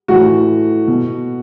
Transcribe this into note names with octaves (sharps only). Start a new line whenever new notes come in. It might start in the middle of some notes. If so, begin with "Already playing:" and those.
A2 E3 F#4
B2